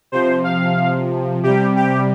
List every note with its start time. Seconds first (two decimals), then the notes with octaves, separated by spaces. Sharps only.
0.12 C3 F3 C5
0.44 F5
1.43 C3 G3 G4
1.76 G4